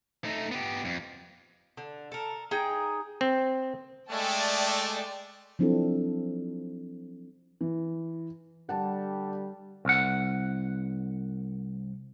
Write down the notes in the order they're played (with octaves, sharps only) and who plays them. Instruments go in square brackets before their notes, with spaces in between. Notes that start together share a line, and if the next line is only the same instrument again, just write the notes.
[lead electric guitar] A3 D#4
B3 G4
F2
[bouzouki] D3
A4 A#4
D#4 G#4 G5
[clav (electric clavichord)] C4
[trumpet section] G#3 A3 [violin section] D5 G5 A5
[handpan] F3 F#3 C4 D4 E4 A4
[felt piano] E3
[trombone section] D3 G3 [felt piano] F#5 A5
[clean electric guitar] C2 F#5